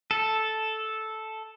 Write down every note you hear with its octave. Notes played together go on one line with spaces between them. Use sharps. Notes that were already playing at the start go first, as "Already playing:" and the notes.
A4